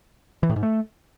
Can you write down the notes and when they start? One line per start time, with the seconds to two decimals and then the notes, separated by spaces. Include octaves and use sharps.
0.43 E3
0.49 A2
0.56 G#2
0.63 A3